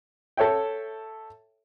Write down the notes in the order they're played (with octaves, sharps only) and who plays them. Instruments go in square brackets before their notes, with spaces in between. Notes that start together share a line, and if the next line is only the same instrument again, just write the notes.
[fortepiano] A4 C#5 E5 G5